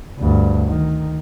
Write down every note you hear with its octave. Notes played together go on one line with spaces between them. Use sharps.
D2 G2
D#3